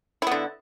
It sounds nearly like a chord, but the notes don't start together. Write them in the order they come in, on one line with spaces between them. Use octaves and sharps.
E4 B3 D3